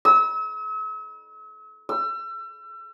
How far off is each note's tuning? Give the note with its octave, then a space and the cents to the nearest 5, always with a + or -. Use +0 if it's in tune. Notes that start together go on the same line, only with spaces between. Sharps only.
E6 -40
E6 +35